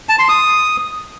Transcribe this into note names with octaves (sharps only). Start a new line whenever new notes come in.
A5
C6
D#6